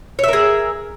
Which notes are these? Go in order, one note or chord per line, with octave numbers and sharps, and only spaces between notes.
G#4 A#4 C#5 E5